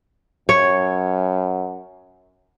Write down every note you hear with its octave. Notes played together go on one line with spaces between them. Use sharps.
F#2 C#5